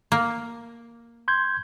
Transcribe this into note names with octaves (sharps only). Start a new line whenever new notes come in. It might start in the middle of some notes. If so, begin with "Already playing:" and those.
A#3
C6 G6 G#6